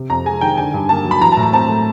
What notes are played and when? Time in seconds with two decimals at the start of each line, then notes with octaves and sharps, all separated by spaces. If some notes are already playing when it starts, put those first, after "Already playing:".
Already playing: C3
0.10 F2 A#5
0.25 G#3 G#5
0.41 D#3 G5
0.57 D3 G#5
0.74 G2
0.89 A#3 A5
1.05 F#3
1.11 B5
1.22 E3 A#5
1.32 A2 A5
1.43 A#5
1.53 C4 A5
1.69 A3